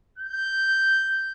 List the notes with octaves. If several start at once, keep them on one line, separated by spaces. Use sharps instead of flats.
G6